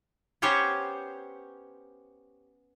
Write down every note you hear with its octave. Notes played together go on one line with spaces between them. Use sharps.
B3 C#4 G4 C5 C#5